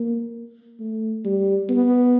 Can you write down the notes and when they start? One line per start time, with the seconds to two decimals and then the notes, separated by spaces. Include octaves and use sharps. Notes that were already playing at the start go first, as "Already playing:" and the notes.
Already playing: A#3
0.80 A3
1.25 G3
1.69 B3